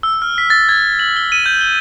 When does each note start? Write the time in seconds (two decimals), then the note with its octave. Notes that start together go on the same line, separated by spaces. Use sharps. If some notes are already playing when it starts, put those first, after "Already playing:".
0.03 E6
0.22 F6
0.38 B6
0.50 A6
0.69 G#6
0.99 F#7
1.16 G7
1.32 D#7
1.46 G6
1.61 G7